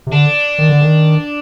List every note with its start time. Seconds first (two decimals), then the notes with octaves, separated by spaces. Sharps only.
0.07 C3
0.12 D3 D4
0.58 D#3
0.69 D3
0.81 D#3